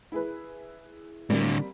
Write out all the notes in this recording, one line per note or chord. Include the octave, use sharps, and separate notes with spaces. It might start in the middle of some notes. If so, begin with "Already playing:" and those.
E4 G#4 B4
A2 D3 G3 A#3 C4